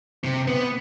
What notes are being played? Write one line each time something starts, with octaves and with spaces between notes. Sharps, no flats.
C3
B3